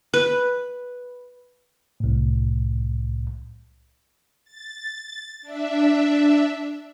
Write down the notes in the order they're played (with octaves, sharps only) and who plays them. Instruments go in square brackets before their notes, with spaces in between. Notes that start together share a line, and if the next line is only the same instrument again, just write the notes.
[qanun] B4
[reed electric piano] C2 A2
[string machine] A6
D4 E5